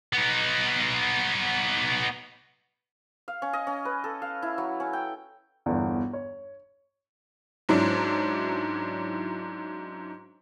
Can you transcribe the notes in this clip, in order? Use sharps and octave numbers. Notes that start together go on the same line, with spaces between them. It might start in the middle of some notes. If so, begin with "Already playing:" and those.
B3 D#4
F5
C#4
D#5
C#4
B4
A4
F5
E4
F#3
C#4
G5
G1 E2
C#5
G#2 F#3 C#4 D4 E4